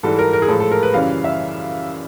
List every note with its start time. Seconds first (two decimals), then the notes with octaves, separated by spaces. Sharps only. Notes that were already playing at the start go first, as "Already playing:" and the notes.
0.03 G#2 E3 G3 A4
0.19 A#4
0.33 A#4
0.42 G#4
0.48 A2 F3 G#3 A4
0.60 A4
0.72 A#4
0.83 B4
0.94 F#2 C#3 E3 G3 F5
1.24 E5